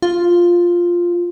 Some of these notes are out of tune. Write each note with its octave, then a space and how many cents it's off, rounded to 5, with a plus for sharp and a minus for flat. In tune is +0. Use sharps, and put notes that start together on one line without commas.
F4 +0